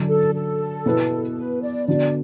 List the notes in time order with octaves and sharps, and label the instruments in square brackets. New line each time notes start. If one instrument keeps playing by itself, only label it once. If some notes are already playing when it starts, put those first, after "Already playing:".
Already playing: [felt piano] D3 F#3 D4
[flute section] A4
A4
[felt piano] B2 B3 E4 B4
[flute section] B4
D5
[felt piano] D3 B3 F#4 [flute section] D5